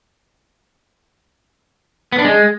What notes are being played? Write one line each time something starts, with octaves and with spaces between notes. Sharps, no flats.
B3
D4
G#3